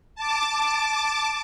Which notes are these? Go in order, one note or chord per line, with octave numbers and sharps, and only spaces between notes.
A5 D6